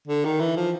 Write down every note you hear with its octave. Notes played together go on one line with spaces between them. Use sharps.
D3
D#3
E3
F3